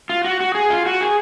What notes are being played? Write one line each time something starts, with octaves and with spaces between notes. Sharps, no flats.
F4
F#4
F#4
G#4
F4
F#4
G#4